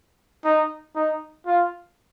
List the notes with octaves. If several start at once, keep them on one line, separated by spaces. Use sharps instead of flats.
D#4
D#4
F4